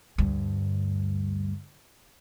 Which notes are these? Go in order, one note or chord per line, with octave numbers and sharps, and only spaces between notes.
D2 G2